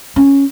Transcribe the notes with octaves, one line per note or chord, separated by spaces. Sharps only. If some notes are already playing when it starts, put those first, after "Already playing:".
C#4